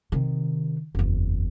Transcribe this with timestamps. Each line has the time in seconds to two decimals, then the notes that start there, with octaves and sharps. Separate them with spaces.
0.12 C3 D#3
0.95 F#1 E2